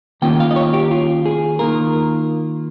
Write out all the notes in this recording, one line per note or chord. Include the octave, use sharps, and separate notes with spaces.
D#3 A#3 C#4 F4 G5
F5
D#5
C#5
G4
F4
G#4
D#3 A#3 F4 A#4